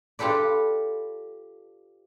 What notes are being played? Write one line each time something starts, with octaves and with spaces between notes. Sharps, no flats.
F4 G4 A4 B4 D5